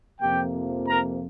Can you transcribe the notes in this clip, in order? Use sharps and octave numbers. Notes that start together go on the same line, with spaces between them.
F2 C3 F3 A#3 G4 G5
A#4 A#5